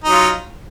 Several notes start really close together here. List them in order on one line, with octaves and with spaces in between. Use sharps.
D#4 F#3 F4